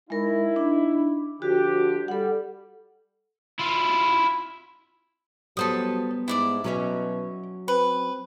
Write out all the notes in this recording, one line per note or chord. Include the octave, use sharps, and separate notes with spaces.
G#3 D#4 E4 A#4
D4
D3 F3 F#4 G4
G3 A4 F#5
E4 F4
F#3 G3 B3 A4 C5 D#6
G#2 E4 D5 D6
B2 F#3 C#4 E5
C4 B4